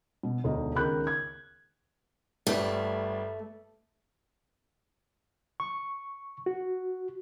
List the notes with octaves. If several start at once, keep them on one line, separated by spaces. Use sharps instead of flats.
B2
E1 D2 D#4 D#5
C#2 D#3 A#4 B5 F#6 G6
G#6
G1 G3 A3
C#6
F#4